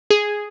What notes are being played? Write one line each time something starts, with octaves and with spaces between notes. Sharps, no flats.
G#4